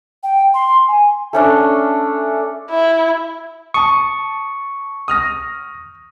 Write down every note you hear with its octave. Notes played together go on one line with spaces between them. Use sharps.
G5
C6
G#5
A3 C#4 D4
E4
A5 C#6 D#6
D#6 F6 A#6